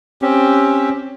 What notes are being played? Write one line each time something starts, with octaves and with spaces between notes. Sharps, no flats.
C4 C#4 G4